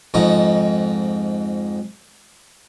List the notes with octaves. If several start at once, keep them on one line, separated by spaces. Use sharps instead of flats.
F2 G#2 D#4